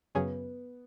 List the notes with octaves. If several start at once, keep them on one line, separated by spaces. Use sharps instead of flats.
F#2 C#3 F#3 B3 C#4 G#4